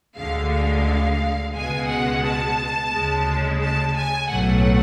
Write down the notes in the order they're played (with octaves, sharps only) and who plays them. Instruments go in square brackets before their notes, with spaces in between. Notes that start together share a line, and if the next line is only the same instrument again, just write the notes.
[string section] D2 D3 G#3 F5
F5
C#2 B2 G#3 G#5
F#5
A5
D2 C#3 G#3
A5
G#5
B1 A2 F#3 A3 F#5